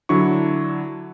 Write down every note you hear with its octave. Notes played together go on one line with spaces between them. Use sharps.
D3 F#3 D4 E4 C#6